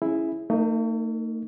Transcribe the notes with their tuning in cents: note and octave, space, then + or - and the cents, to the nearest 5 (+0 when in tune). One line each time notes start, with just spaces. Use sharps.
C#4 -15 E4 +0 G#4 +0
A3 +45 D#4 +0 A#4 +0